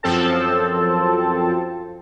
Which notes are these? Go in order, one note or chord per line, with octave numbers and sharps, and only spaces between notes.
F#2 F3 C4 A4 A5